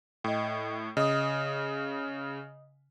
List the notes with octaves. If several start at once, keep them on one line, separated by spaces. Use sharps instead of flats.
A2 D#5 G5
C#3 D#5 D#6